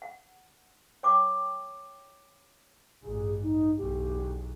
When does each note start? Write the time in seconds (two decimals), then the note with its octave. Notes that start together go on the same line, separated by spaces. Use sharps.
0.02 F#5
1.03 C#5 G5 C6 D6
3.02 A1 G2 G#4
3.41 D#4
3.77 B1 E2 G4